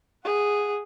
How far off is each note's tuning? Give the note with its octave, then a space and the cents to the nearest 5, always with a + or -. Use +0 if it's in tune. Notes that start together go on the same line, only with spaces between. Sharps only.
G#4 -5 F#5 +0